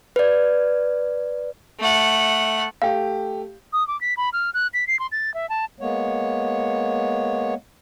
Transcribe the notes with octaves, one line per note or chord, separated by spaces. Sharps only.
B4 D5
A3 F#5
A3 G4 F5
D#6
D6
B6
B5
F6
F#6
B6
C7
C6
A6
E5
A5
G#3 A#3 B3 C#5